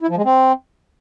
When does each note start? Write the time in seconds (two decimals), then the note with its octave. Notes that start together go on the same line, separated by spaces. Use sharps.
0.01 E4
0.09 F3
0.17 G#3
0.25 C4